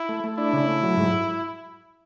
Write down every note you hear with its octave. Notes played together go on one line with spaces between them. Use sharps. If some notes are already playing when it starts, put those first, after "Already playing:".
Already playing: E4
A3
A3
D4 E4
C#3
A3
F#3
G#2